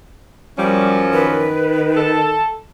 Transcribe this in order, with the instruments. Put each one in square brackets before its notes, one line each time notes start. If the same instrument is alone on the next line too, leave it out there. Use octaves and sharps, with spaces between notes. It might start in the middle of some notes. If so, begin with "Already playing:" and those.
[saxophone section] F#2 F3 C#4 [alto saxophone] G3
[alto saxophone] D#3 [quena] B4
[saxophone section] A4